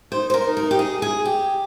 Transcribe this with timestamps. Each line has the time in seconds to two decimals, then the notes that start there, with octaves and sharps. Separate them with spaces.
0.12 D#4 C5
0.30 C5
0.34 A#4
0.45 D#4
0.57 A#4
0.71 G4
0.79 G#4
1.02 G#4
1.25 G4